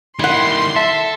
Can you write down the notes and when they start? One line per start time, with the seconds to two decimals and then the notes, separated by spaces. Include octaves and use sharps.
0.19 D#3 G3 E4 F#5 C6
0.76 A4 E5